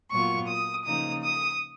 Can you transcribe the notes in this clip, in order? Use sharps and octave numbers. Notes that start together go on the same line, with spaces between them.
A#2 F#3 B3 F4 C#6
D#6
C#3 F3 A#3 D#4 D#6
D#6